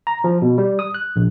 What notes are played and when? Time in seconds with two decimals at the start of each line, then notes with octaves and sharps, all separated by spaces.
0.07 A#5
0.24 F3
0.42 B2
0.58 G3
0.79 D#6
0.94 F#6
1.16 A#1